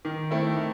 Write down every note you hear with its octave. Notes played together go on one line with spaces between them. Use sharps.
D#3
A3 C4 E4
D#3